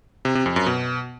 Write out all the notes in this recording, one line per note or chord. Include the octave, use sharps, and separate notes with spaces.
C3
C3
F2
F#2
B2